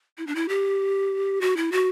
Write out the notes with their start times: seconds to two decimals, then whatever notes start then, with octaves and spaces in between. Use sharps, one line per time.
0.18 E4
0.27 D4
0.35 E4
0.49 G4
1.41 F#4
1.57 E4
1.72 F#4